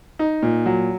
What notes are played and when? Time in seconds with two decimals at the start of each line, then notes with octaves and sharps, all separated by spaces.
0.19 D#4
0.43 A#2
0.66 F#3